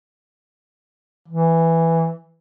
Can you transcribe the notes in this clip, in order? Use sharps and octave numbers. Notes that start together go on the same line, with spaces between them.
E3